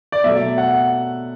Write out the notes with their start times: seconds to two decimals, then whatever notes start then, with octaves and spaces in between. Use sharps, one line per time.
0.12 D5
0.24 B2 F#3 A3 E5
0.58 F#5